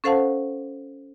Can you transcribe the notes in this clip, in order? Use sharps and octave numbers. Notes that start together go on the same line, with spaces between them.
C#4 A4 C5 F5 F#5 A5